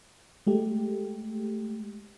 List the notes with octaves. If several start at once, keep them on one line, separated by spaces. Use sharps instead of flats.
G#3 A3 G4